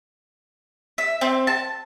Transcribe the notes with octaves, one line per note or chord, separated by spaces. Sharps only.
E5
C4
A5